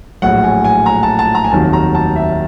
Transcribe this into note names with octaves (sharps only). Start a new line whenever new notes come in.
A#1 A2 F#3 F#5
G#5
G#5
A#5
A5
A5
A#5
G#5
F1 D#2 D#3 F#3 A5
A#5
A5
E5